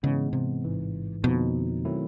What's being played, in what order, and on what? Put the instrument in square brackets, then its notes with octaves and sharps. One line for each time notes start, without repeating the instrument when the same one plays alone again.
[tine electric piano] G#2 E3 G#3 B3 [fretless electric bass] C#3
[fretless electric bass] C3
[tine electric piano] A1 G#2 E3
[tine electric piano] F2 D3 F3 A#3 D#4 [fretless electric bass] B2
[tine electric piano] D#3 F#3 A3 C4 E4